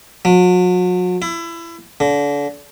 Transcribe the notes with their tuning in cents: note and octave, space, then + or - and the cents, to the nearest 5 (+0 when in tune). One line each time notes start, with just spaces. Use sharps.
F#3 -40
E4 +25
D3 -35